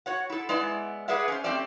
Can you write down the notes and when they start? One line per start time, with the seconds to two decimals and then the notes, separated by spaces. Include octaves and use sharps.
0.06 F#4 C#5 F#5
0.30 E4 A4
0.49 G#3 B3 E4 D5
1.08 G#4 B4 D5 E5 F#5
1.28 C#4 C5
1.44 A3 C4 C#4 G4 D5 E5